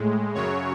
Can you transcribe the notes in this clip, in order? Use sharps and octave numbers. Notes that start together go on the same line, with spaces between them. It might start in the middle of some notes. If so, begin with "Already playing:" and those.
Already playing: A2 G#3
F#2 C#3 F#3 C#5